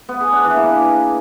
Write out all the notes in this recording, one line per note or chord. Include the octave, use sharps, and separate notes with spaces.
B3
G#4
D4
E3
A#3